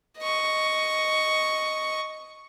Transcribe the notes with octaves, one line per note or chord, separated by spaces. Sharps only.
D#5 C#6